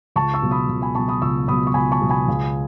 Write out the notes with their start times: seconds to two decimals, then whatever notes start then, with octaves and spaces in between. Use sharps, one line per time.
0.16 C#2 A5 C#6
0.34 C#6 E6
0.42 B2 F#3
0.51 B5 D#6
0.69 C#2
0.82 G#5 B5
0.95 B2 F#3 A5 C#6
1.08 B5 D#6
1.22 C#2 C#6 E6
1.48 B2 F#3 B5 D#6
1.67 C#6
1.74 C#2 G#5 B5
1.92 A5 C#6
2.01 B2 F#3
2.10 G#5 B5
2.28 C#2